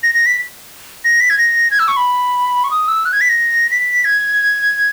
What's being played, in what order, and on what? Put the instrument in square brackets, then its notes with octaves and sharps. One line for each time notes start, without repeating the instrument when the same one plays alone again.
[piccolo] A#6
A#6
B6
A#6
B6
G#6
A#6
G#6
E6
C#6
B5
C#6
D#6
E6
F#6
G#6
B6
A#6
B6
G#6